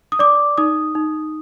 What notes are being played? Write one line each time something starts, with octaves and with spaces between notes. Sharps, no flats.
D#6
D5 D6
D#4 D#6
D#4